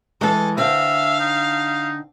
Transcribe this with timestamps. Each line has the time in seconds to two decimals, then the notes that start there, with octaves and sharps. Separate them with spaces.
0.21 E3 G#3 A4
0.58 D3 C4 E5 F5
1.19 D#4